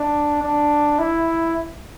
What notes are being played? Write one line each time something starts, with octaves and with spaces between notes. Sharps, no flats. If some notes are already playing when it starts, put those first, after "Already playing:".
Already playing: D4
D4
E4